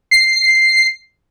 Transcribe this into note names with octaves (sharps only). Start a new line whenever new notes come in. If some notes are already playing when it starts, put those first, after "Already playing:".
C7